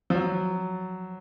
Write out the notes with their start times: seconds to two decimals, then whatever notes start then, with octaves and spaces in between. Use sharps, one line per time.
0.10 F3
0.15 F#3